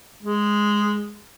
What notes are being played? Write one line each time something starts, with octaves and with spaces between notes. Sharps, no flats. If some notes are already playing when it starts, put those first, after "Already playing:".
G#3